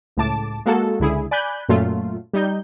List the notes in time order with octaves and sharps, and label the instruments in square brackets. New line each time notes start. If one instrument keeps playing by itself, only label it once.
[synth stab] C#2 A2 A5 D6
G#3 A#3 F#4 A4
C#2 D3 E4 G#4
D5 G#5 B5 F#6 G6
F#2 A#2 F#3 A3 F4
G3 D#4 G6